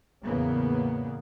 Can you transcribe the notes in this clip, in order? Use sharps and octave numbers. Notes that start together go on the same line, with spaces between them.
E2 A2 C#3 A#3 B3